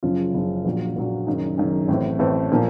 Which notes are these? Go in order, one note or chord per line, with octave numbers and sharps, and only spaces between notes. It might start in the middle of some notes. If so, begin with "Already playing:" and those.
F#1 F#2 C#3 F3 F4
F#1 F#2 C#3 F3
A#1 A#2 F#3
A#1 A#2 F#3
F#1 F#2 D#3
F#1 F#2 D#3
A1 A2 A3 C4
A1 A2 A3 C4 A4
A#2 F3 A#3